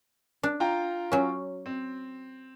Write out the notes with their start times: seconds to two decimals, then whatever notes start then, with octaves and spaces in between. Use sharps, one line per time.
0.43 D4
0.60 F4 G5 A#5
1.12 F#3 C#4
1.66 C4